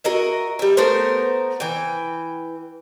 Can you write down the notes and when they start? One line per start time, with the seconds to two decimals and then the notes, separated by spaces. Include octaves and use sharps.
0.04 F#4 A#4 D#5 E5
0.59 G3 E5
0.77 A3 B3 A#4 C5
1.60 E3 G5